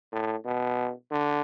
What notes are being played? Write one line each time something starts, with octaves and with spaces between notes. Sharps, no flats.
A2
B2
D3